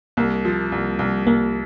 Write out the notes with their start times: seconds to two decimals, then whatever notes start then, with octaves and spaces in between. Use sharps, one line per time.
0.17 C2 A#3
0.45 F3
0.72 C2
0.99 C2
1.27 C2 A#3